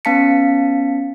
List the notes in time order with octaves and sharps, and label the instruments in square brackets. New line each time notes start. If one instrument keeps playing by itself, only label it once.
[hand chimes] B3 C#4 F5 A5 B6 C#7